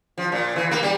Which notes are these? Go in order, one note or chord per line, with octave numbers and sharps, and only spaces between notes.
F3
A#2
E3
A#3
G3